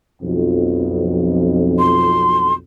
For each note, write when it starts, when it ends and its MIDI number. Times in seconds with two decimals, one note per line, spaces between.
0.22 2.58 35
0.22 2.58 41
1.79 2.53 84